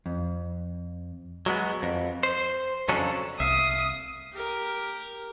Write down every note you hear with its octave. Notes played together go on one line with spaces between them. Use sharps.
F2
F#3 G#3 B3
F2
C5
F2 C#3 F#3 C#4 D4 A4
C2 E5 F5 D#6
G4 A#4